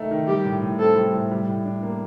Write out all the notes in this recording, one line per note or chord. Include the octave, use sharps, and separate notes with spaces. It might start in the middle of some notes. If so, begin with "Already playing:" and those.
Already playing: D#3 A3 D#4
D#3
G3 G4
A2
A2
C4 A4
G3
A2
G3
A2
D4
A#3